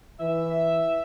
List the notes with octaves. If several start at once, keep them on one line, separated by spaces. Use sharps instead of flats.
E3 E5